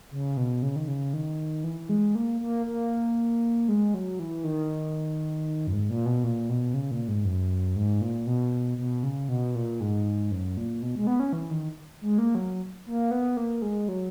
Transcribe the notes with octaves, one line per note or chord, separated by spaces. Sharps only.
C#3
B2
C#3
D#3
C#3
D#3
E3
G#3
A#3
A#3
A#3
G#3
F#3
E3
D#3
F#2
G#2
A#2
B2
A#2
B2
C#3
A#2
G#2
F#2
G#2
A#2
B2
B2
C#3
B2
A#2
G#2
F#2
A#2
B2
G#3
B3
C#4
E3
D#3
G#3
A#3
F#3
A#3
B3
A#3
G#3
F#3